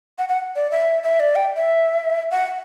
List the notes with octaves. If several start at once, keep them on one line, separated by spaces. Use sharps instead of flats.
F#5
F#5
D5
E5
E5
D5
G5
E5
F#5